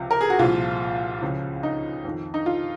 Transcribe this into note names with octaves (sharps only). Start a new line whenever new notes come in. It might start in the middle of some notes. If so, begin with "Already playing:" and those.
Already playing: C#2 C3 F3
A#4
G#4
F#4
C2 A#2 F3 F4
C#2 C#3 F3
D#4
F2 D#3
D#4
F4